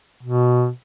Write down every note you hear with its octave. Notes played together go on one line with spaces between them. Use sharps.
B2